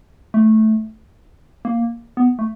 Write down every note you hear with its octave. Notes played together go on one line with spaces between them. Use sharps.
A3
A#3
B3
A3